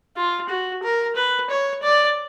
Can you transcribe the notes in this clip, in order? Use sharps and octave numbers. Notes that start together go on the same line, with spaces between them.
F4
F#4
A#4
B4
C#5
D5